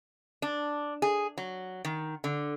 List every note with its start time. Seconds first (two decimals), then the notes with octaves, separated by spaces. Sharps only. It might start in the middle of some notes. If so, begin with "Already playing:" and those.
0.42 D4
1.02 G#4
1.38 F#3
1.85 D#3
2.24 D3